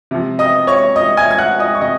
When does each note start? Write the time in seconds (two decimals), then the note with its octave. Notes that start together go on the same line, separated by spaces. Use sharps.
0.11 C3 F3
0.39 D#5 D#6
0.67 C#5 C#6
0.96 D#5 D#6
1.17 G#5 G#6
1.31 G#6
1.38 F#5 F#6
1.59 D#5 D#6
1.75 C#6
1.81 C3 D#5 D#6